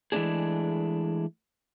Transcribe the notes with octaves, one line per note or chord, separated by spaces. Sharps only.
E3 G#3 A3 B3 D4 G#4